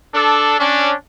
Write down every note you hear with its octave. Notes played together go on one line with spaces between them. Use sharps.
D4 A4
C#4 D4